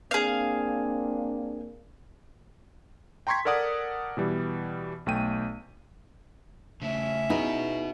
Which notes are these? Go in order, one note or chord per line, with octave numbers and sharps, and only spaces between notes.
A#3 C4 D4 G#4 F5
G5 A#5 C6 C#6 G#6 B6
A4 A#4 D5 F#5 D#6
B2 E3 G3
B1 A3 G5 D#7
C#3 A3 C#4 E5
B3 D#4 E4 F#4 G#4 B4